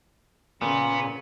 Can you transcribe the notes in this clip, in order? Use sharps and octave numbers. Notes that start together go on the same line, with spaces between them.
A#2 C#3 B3